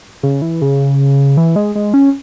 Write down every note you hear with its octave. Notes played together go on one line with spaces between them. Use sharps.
C#3
E3
C#3
E3
G#3
G#3
C#4